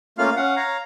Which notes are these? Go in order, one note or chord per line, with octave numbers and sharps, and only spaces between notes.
A3 A#3 C#4 F4 F5 F6
C#4 F5 F#5
C#5 F5 A#5